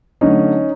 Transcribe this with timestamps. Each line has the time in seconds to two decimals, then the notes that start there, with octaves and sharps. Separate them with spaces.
0.21 D3 F#3 A3 C#4 D#4